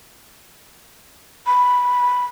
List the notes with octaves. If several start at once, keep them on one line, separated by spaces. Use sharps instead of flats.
B5